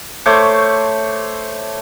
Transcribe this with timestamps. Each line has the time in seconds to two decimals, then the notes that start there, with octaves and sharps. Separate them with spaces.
0.26 A3 C5 C#5 D6